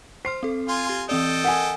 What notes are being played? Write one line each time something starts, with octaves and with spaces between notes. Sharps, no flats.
C5 C6 F6 C7
C4 A4
F4 G#5 C6
G4
E3 C4 A4 D5 D#5 G5
A#4 F#5 G#5 B6